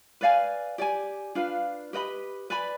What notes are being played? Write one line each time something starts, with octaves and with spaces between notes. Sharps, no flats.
B4 D5 F5 G#5
G4 D5 G#5
D4 F4 B4 F5
G4 B4 D#5 B5
B4 D5 G#5 B5